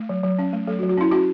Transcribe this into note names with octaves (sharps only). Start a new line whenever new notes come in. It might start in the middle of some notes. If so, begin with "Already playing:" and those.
Already playing: A3
F#3
F#3
C#4
A3
F#3 A3 A4
F#4
F#3
F#4
C#4 E4
C#4 F#4